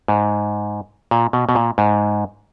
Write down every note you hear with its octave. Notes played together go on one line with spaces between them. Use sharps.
G#2
A#2
B2
B2
A#2
G#2